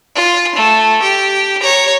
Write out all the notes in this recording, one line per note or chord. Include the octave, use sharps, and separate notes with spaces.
F4
A3
G4
C#5 A#5